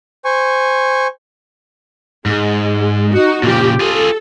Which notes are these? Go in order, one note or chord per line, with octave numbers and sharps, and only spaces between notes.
C5 G#5 C#6
G#2 G#3
D#4 F#4
A#2 C#3 F3 G4
F4 G#4 A4